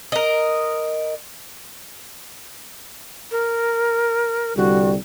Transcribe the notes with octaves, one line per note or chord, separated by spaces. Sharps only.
A#4 D#5
A#4
C2 D3 G3 F#4